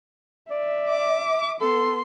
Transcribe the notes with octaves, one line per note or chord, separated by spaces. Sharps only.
D5 E5
D6
B3 A4 C6